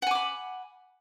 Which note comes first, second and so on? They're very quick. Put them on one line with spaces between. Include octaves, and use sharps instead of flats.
F#5 G#5 D6 B5